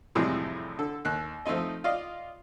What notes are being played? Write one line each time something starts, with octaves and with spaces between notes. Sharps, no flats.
F2 A2 C3 E3 G3 G#3
D3 A4
D#2 F#6
F3 A3 C4 D#4 D#5
F4 D5 D#5 F5